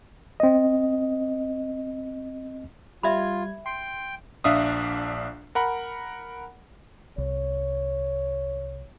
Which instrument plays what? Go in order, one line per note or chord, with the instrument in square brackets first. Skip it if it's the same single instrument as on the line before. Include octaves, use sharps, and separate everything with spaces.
[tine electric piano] C4 D#5
[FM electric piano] G3 G#6 [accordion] F4 [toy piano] E5 B5
[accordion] G5 [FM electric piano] C6
[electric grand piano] A#1 D4 E5 F5 D#6
A#4 F#5 B5
[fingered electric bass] C2 [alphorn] C#5